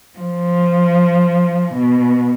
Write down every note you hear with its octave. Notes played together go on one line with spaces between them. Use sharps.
F3
B2